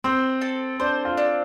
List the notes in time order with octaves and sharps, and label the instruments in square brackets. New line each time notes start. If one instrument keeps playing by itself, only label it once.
[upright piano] C4 [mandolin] C5
[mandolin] A4
[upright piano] D4 [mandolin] C5
[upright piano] F4
[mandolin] D4